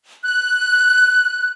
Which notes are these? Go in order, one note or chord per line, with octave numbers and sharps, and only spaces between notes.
F#6